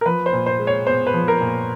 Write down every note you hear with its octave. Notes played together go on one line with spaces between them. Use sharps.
A#4
F3 B4
C5
A#2
C5
G#3
C#5
B3 C5
B4
F3
A#4
A#2